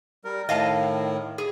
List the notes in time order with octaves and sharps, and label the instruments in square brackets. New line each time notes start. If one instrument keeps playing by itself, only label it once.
[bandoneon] G3 A#4
[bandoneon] A2 D#3 [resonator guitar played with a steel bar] D#5 F5 A5
[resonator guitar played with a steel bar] G#4